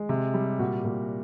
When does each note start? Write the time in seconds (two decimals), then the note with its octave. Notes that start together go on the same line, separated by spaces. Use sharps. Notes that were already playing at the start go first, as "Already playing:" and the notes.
Already playing: G#3
0.09 C3
0.34 G3
0.59 A#2 F#4
0.84 A#2